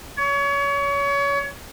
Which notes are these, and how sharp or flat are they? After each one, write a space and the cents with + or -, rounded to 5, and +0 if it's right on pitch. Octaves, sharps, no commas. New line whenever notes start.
C#5 +30